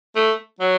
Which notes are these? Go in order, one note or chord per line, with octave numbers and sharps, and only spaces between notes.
A3
F#3